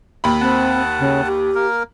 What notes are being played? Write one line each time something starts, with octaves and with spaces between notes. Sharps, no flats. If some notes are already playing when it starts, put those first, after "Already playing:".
D#2 B5
C4 F#5 A5
C#3
G4
A#3 A#4